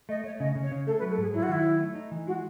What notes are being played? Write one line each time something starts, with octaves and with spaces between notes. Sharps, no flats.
A3 D#5
A3 C#5
C#3 D#5
C#3
C#5
C#3
A3 A4
B4
F#3
A4
G#2 G#4
F#3 E4
F#4
D#3 E4
F#3
A3
D#4
E3
G#3 F#4